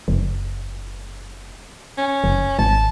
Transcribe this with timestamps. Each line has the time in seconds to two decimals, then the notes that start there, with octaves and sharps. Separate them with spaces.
0.08 F#1
1.98 C#4
2.24 F#1
2.59 G#1 A5